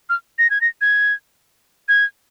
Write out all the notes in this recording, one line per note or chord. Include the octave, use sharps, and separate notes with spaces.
F6
A#6
G#6
A#6
G#6
G#6